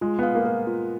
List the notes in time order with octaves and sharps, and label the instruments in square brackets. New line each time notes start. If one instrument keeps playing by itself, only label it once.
[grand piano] G#3 [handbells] F4
[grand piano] B3 [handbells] F5
[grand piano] A#3
[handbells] A#4
F4